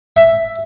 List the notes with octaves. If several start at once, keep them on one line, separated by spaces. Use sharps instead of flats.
E5